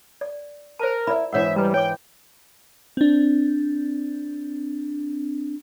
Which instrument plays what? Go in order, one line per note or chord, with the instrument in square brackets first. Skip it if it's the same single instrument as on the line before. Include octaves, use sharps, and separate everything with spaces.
[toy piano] D5
[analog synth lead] A#4 [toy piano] C5 A5
[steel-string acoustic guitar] E4 E5 [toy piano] D5 B5
[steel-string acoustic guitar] G#2 E3 [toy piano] D4 C#5 F#5 [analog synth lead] E5
[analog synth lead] G3 [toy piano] B4 A#5
[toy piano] C#5 D6 [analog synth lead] G5
[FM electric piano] C4 D4